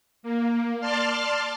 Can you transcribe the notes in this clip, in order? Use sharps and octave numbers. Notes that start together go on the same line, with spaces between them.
A#3
D5 A5 C6 F6